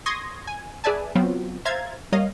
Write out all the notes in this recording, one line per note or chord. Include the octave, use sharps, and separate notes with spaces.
C6 C#6 D#6 G#6 A#6
G#5
G#4 B4 D5 E5 G#5 A5
F#3 B3 C4 F4
C5 E5 F5 A#5 G#6 A6
G3 A#3 C#5 D#5 F5